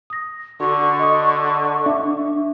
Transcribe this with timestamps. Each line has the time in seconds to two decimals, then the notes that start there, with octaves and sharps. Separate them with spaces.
0.10 D#6 A#6
0.60 D3 F#4 C#6
1.00 D#5 D#6
1.86 D4 E5 D6